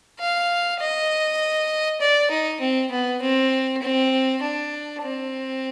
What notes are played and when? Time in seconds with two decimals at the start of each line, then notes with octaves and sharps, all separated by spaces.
0.19 F5
0.80 D#5
2.01 D5
2.31 D#4
2.60 C4
2.91 B3
3.21 C4
3.82 C4
4.42 D4
5.03 C4